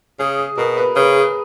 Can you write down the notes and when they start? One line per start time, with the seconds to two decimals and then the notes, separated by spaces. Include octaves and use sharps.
0.19 C#3 G#4
0.38 G#4
0.57 B2 A#4
0.77 B4
0.96 C#3 B4
1.15 G#4